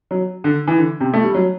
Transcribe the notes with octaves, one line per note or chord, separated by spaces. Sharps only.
F#3
D3
E3
D3
C3
A3
G3
F#3